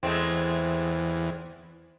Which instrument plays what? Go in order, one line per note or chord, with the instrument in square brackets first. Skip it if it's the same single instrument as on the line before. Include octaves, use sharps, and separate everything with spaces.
[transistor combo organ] E2 [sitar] G#3 A3 C4